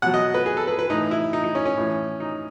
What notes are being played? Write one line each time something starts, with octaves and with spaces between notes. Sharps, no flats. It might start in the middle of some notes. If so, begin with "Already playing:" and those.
B2 F#3 F#5
D#5
B4
G#4
A4
B4
B4
A2 E3 D#4
E4
D#4
D#4
C#4
C#4
A2 E3
D#4